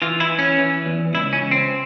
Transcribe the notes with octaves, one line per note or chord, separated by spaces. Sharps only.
E3 F4
E4
E3
C#4
E3
E2
C#2 E4
C#4
C#2
C4